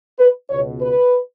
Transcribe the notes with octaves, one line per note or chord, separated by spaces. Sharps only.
B4
C#2 B2 C#5
B4